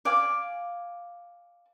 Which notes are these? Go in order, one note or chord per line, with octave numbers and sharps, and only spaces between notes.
D5 F5 G#5